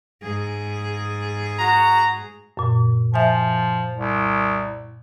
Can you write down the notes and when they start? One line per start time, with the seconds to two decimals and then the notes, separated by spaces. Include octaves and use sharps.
0.22 G#2 G#4
1.58 F#4 A#5
2.57 F#2 A#2
3.14 F3 E5 G#5
3.97 C2